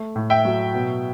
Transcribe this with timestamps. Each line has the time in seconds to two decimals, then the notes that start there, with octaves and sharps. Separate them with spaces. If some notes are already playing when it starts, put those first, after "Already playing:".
Already playing: A3
0.16 A2
0.30 E5 G5
0.45 F#3
0.74 B2